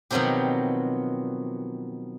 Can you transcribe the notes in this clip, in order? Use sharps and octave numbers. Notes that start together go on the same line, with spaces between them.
B2 D#3 F3 F#3 C4 G4